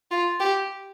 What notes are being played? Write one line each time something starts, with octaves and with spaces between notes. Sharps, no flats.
F4
G4